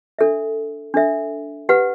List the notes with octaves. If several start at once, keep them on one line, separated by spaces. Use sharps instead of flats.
D4 A4 E5
D4 A4 E5
G4 B4 F#5